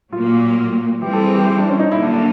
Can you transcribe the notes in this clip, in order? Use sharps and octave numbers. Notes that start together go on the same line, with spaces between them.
A#2 F#3 A#3 F4
E3 G3 C4 G4
A4
G#4
G4
G4
D4
C#4
D#4
D3 F#3 A#3 E4
D4
D4